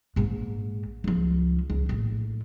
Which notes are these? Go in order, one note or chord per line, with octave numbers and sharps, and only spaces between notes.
A#1 G#2
C#2 F3
C#2
A#1 A2